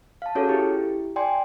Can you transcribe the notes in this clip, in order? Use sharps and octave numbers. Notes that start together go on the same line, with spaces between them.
F5 A5
C#4 F#4 G#4 A4 C#5
E4 G4
D5 G5 G#5 C6